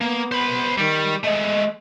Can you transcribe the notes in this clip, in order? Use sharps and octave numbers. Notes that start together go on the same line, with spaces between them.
A#3 B3
C5 B5
D#3 G3
G#3 A3 D#5